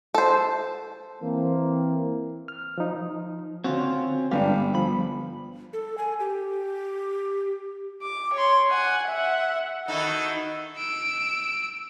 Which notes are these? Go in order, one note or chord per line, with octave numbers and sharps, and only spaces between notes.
A4 C5
E3 A#3 C4
F6
F3 D#4
D3 C4 C#4 F4 F#4
G1 G#2 D4 G4 B4 F5
F3 B5
A4
G#5
G4
D6
C#5 C6
F#5 G#5
E5 F#5
D#3 D#4 E4 F#4 A4 D#5
E6 D7